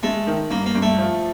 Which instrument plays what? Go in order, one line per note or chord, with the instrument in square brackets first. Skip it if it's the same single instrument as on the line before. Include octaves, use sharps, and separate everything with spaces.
[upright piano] G#3 [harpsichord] A3
[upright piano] D#3
[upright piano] G2 [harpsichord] A#3
[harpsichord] A#3
[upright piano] G2
[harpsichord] A3
[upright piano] F3